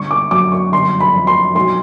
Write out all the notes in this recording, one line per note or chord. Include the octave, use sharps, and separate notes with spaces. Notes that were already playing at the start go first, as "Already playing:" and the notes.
Already playing: G1 C#6
D6
F#2 D6
C#6
G1 C6
B5
F2
C6
B1 C6